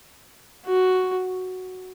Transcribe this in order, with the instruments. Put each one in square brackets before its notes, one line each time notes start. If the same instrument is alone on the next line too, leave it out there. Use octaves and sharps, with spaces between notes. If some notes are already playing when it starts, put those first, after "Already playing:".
[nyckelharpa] F#4